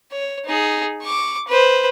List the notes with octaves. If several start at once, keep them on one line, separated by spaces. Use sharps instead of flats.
C#5
D#4 G#4
C#6 D6
B4 C5